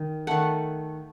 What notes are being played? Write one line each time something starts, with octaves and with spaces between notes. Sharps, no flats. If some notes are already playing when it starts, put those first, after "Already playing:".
Already playing: D#3
D#3 A3 F#5